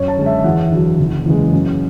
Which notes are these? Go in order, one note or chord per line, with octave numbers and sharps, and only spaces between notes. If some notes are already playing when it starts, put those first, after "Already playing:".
Already playing: F#2 C#5
A5
D3 G#3
E5
E2 F#5
D3 F#3
F#1
E2 C#3 G#3
F#2